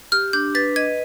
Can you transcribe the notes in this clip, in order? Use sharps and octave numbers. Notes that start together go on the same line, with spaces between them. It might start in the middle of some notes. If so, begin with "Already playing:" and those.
G4 F6
D4 G6
B4 A6
D#5 G#6